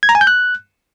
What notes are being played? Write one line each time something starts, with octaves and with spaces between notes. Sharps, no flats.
G#6
A#5
G#5
G6
F#6